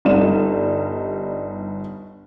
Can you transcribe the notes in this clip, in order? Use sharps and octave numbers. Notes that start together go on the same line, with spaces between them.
G1 G3 D#4 E7